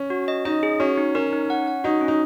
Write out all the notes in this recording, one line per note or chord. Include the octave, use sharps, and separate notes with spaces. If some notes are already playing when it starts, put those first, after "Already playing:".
Already playing: C#4
F#4
D#5
D#4 D#5
G#4
C#4 F#4
D#4
C#4 A#4
D#4
F#5
F#5
D#4 F#4
C#4
D#4